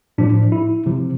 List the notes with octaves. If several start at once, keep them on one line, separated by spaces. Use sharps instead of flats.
A2 F3 D4
E4
C3 F3